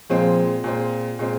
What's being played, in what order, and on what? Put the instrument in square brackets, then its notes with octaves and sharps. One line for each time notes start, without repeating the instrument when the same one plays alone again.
[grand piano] A#2 G#3 C4 [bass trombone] F3
[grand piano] A#2 G#3 C4
A#2 G#3 C4